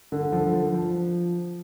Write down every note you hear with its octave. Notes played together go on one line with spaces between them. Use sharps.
D3
F3
F3
F3